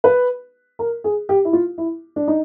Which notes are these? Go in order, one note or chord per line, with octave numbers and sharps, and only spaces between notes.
B4
A#4
G#4
G4
E4
F4
E4
D4
D#4